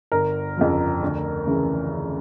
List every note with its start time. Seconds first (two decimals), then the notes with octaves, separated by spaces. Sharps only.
0.12 G1 A#4
0.57 F2 C#3 F3
1.03 D2
1.47 C#3 E3